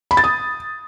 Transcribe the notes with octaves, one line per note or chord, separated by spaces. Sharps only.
B5
A6
D#6